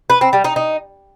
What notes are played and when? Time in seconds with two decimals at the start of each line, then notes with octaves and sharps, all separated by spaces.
0.10 B4
0.21 C4
0.33 G3
0.44 D#4
0.56 D#4